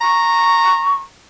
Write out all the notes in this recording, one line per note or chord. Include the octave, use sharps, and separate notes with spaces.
A#5 C#6